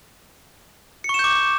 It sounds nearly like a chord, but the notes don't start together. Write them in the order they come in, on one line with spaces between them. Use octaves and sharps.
C#7 C#6 E7 G6 D6